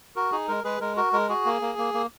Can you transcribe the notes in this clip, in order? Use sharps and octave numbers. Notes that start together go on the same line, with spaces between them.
F#4 A#4
D#4 G#4
G#3 A#4
G#3 G#4 B4
G#3 A#4
F#4 A#4
G#3 A#4
F#4 G#4
A#3
A#3
A#3
A#3